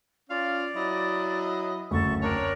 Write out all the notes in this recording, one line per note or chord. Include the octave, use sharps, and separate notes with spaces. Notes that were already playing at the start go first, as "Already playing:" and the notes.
C#4 F4 D5 F5
F#3 E4 D#5
F#1 D2 A4 C#6
C4 D4 A#4 C#5